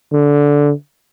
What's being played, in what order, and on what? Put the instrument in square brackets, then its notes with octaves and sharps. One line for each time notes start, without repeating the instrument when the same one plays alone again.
[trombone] D3